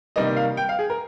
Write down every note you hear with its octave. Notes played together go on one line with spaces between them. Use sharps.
C3 D#3 G3 A#3 D#5
F5
G5
F5
G#4
A#4